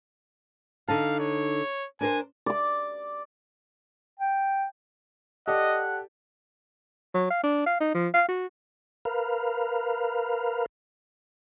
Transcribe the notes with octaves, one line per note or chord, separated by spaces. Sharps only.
D3 D#4 F5 A5
C#5
D4 A#4 C5 G#5
D5 D6
G5
G4 A4 D5 D#5 F#5
F#3
F5
D4
F5
D#4
F3
F5
F#4
A#4 B4 F5